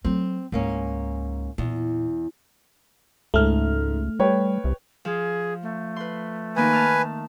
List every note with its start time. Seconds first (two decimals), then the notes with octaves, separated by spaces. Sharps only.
0.04 F#3 A3 C4
0.52 C#2 G#2 A#3 C#4
1.58 E2 A#2 B3
3.34 C#2 G#2 A3 F6
4.19 G3 B4 C#5 G5
4.64 C2
5.05 F3 G#4
5.62 A3
5.96 B4 C6
6.56 D#3 A#3 D#4 B4 G#5
6.73 A5 F6